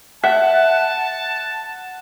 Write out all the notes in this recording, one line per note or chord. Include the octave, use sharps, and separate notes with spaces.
E5 F#5 A5